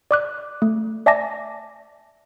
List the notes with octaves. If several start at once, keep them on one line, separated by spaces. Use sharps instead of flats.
D5 D6 F#6
A3
D5 E5 G#5 A5 D6 A#6